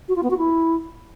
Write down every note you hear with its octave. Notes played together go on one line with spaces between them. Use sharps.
F#4
F4
B3
F#4
E4